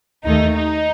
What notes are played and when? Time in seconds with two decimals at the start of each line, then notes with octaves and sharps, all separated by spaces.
0.24 D#2 D#3 A3 D#4
0.55 D#4